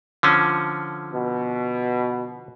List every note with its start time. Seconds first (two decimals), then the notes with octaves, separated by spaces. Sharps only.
0.23 D3 F3 C#4
1.13 B2